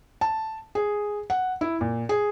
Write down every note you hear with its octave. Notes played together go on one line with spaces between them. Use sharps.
A5
G#4
F#5
E4
A#2
G#4